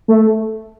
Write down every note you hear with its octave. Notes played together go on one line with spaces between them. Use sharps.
A3